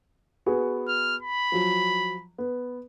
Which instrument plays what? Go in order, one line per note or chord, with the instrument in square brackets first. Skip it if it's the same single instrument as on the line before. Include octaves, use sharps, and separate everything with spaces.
[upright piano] B3 F#4 G#4
[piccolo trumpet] F6
B5
[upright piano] F3 F#3
B3